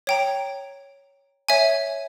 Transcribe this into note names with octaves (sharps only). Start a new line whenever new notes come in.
C#5 G5 A#5
C#5 E5 G#5